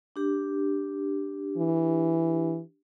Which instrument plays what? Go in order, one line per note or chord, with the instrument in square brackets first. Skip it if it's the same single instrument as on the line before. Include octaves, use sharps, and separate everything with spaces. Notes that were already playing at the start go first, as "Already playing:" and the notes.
[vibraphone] D4 G4
[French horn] E3